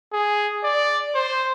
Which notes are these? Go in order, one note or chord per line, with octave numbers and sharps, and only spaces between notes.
G#4
D5
C5